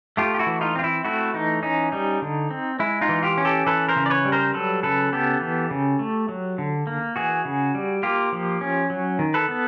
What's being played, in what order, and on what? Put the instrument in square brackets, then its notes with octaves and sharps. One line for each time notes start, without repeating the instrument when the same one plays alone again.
[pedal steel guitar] A3 F4 G4
G4
E4 F#4
E3
D#4 F4
C4 F4
E4
A3 E4 F#4
E3 D#4
C#4 D#4
G3 D#4
D3
C4
G#3 E4
D#4 F4
E3
F4 G4
C#4
G4 A4
E3 A4 B4
A#4 C5
C#3
D5
B4 C#5
G3
A#4 C5
F#3 A4 B4
C#3 A4 B4
B3 G4 A4
E3
C#3
A3
F#3
D3
A#3
E3 F#4 G#4
C#3
G3
A#3 F4 G4
F3
C#4
F#3
D#3
A4 B4
B3